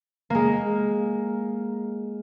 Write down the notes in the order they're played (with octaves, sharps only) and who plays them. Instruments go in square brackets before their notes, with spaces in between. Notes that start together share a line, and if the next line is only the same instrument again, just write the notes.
[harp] G#3 A#3